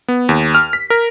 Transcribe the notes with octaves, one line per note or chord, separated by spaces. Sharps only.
B3
D#2
F6
B6
A#4